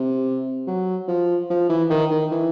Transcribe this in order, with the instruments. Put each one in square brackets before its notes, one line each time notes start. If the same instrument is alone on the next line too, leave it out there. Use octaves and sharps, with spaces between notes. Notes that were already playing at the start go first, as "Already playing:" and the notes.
Already playing: [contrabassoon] C3
F#3
F3
F3
E3
D#3
D#3
E3